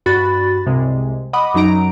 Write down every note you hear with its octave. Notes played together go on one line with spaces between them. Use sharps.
G2 F#4 B5 A6
C2 C3 G#3
D#5 F#5 B5 D6 D#6
F#2 F#3 D#4 A#5 D7